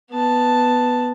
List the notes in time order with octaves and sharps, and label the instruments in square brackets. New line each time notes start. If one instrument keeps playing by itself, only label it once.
[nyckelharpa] B3 A5